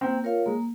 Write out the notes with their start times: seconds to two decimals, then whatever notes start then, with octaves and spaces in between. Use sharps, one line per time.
0.01 A#3 C4
0.24 F4 A#4 C#5 F5
0.46 G#3 A#3